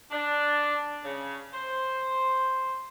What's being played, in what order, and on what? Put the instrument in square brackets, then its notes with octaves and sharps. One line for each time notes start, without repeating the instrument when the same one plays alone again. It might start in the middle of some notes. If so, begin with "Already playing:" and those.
[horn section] D4
C#3
C5